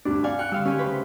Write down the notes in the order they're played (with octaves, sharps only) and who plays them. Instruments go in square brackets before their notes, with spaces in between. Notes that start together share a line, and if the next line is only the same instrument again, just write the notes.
[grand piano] D2 G2 C3 [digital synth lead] D4
[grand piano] D5 [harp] F5 F#5 C#6 [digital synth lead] G#5
[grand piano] G5 F6 F#6 [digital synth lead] C#7
[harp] D3 F5 E6 [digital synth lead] G3
[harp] D#3 G#5 G6 [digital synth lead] C#4 [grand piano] G4
[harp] D2 C#3 C5 [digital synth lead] B4